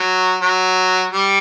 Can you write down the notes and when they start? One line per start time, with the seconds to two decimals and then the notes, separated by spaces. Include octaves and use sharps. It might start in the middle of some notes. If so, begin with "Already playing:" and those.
Already playing: F#3
0.42 F#3
1.12 G3